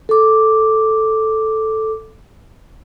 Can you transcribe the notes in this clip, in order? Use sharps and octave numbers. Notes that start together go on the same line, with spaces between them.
A4 D6